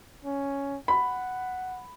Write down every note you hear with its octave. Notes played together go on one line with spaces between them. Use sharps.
C#4
F#5 B5